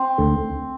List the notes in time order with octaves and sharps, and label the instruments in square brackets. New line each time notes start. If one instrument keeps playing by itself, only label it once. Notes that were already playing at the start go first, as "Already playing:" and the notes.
Already playing: [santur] C4
[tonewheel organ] D2 D3 A3